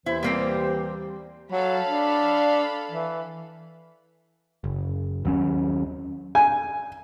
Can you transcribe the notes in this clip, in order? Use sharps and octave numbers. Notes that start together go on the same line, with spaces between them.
D#2 E3 E4 C5
G3 A#3 C4
F#3 A4 F5 B5
D4
E3
F#1
D#2 F#3 C#4
G#5